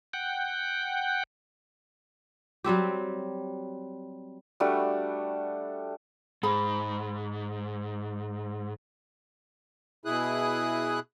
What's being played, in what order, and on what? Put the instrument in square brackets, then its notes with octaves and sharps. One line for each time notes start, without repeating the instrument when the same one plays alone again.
[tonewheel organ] F#5 G5
[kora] F#3 G3 C4 G4
[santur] G3 A3 D4 F#4
[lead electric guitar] G#2 [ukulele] G#4 B5
[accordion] B2 E4 G#4 D#6 F#6